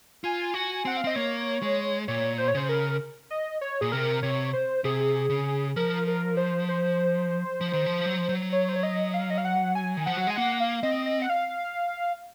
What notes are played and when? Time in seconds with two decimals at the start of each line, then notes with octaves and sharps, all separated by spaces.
0.24 F4 G#5
0.54 F#4
0.85 C4 F#5
0.97 F5
1.04 C4 D#5
1.16 A#3 C#5
1.62 G#3
2.08 A#2 C#5
2.38 C5
2.48 C#5
2.55 C#3 C5
2.69 A#4
3.30 D#5
3.61 C#5
3.81 A#2 G#4
3.92 C3 A#4
4.23 C3 C#5
4.53 C5
4.84 C3 G#4
5.30 C#3
5.76 F3 A#4
6.07 A#4
6.37 C5
6.69 C5
7.61 F3
7.73 D#3
7.86 F3
8.06 F#3
8.18 F3
8.29 F#3
8.52 C#5
8.69 C5
8.76 C#5
8.83 D#5
9.14 F5
9.30 D#5
9.38 F5
9.45 F#5
9.75 G#5
9.97 D#3
10.06 F3 F#5
10.17 F#3
10.27 G#3 G#5
10.36 A#3 F#5
10.60 F5
10.83 C4 D#5
11.06 D#5
11.22 F#5
11.30 F5